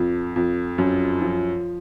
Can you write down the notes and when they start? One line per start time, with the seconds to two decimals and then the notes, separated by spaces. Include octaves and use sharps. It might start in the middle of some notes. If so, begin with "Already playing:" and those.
Already playing: F2
0.36 F2
0.78 F#2
1.21 F3